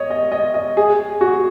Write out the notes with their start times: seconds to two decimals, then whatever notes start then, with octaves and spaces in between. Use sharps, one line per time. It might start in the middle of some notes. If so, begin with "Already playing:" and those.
Already playing: C#5 D#5
0.10 D#5
0.32 D#5
0.54 D#5
0.77 G#4
1.21 F#4